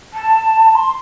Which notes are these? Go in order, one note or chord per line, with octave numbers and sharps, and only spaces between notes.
A5
C6